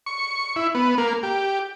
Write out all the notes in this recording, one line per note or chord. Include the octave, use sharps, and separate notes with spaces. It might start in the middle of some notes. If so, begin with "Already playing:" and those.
C#6
E4
B3
A#3
G4